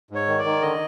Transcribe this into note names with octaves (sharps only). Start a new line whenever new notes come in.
G#2 C#5
D#3
D5
D#3
D3 D#5